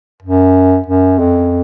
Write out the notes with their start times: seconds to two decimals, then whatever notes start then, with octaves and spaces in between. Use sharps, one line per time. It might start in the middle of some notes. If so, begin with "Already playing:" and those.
0.23 F#2
0.86 F#2
1.19 F2